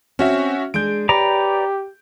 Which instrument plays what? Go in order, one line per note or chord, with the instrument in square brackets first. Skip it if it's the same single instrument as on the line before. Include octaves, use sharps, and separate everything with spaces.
[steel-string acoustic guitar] C4 [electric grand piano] C#4 F#4 E5
[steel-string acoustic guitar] G#3 D4 G#4 [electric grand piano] G6 D7
[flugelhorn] G4 [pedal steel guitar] B4 D5 A#5 [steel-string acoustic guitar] C#5